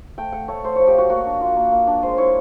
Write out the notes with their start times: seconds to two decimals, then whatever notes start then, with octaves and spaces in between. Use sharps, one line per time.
0.18 A3 G5
0.33 A3 F#5
0.48 A3 C#5
0.64 A3 C5
0.76 F3 C#5
0.87 G4
0.94 A3 F#4
1.10 A#3 F#4
1.26 D4
1.41 F4
1.57 A#3
1.72 A#3
1.87 D4
2.02 G#3 C5
2.18 E4 C#5